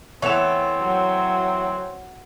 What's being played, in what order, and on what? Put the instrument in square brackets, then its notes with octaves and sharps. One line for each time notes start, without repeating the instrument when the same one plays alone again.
[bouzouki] E3 A3 B3 [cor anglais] C4 [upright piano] C#5 E7
[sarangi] F#3